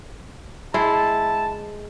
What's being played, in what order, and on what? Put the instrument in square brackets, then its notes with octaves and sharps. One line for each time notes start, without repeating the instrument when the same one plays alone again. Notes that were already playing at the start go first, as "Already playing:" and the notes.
[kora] G#3 [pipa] E4 [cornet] A5